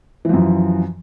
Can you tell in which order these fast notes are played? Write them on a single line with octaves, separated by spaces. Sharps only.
E3 F3 F#2